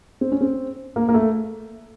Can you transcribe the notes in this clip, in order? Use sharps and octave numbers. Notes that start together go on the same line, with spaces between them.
C4
C#4
C4
A#3
A#3
A3